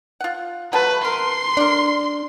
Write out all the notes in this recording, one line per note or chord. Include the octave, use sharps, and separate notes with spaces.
F4 F#5
F#3 A3 B4 A5
A#4 C6
A3 D4 A#4